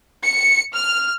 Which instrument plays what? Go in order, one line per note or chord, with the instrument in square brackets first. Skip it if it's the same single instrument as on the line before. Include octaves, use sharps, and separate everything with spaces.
[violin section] C#7
F6